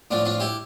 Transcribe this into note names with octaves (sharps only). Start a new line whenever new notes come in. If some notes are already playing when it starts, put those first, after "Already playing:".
A2 F3 D4 F4
D4 F4
E4 G4